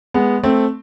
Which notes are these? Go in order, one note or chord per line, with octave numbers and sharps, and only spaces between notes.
G#3 B3
A3 C4